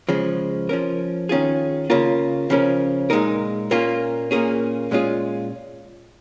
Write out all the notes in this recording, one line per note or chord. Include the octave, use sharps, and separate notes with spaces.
C#3 F3 G#3
F3 C#4 A#4
D#3 C#4 F4 G#4
C#3 A#3 F4 A#4
C#3 F3 C#4 A#4
A#2 G#3 D#4 A#4
A#2 A#3 C#4 F4
A#2 A#3 C#4 G#4
A#2 G#3 C#4 F4 G#4